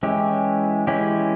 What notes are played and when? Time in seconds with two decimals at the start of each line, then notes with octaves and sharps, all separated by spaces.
0.03 E3 G#3 C#4 E4 G4
0.87 E3 G#3 C#4 E4 G4